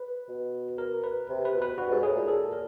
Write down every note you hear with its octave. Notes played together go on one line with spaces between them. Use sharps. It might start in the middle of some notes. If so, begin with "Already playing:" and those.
Already playing: B4
B2
A#4
B4
C3
B4
B2
B4
G2 F#4
G#2
A2 G#4
A#2
A4
A#4